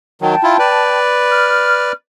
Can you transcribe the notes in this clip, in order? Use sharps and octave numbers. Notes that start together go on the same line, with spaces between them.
D#3 F#3 G5 A5
E4 F4
B4 D5
F6